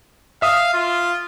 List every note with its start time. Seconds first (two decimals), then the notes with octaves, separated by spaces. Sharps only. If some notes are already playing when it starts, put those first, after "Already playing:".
0.42 E5 F5 D#6
0.74 F4